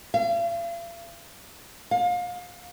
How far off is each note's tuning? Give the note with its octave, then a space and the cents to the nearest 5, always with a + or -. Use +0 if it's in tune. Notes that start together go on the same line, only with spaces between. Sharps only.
F5 -45
F5 +30